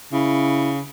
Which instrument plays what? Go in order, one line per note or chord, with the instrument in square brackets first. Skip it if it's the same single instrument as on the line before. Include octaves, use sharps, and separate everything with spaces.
[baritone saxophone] C#3 [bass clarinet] E4